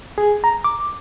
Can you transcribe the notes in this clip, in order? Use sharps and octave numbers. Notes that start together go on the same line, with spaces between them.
G#4
A#5
D6